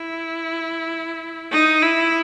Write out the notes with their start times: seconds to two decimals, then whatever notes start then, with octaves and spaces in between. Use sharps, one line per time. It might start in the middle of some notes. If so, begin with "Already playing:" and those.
Already playing: E4
1.52 D#4
1.82 E4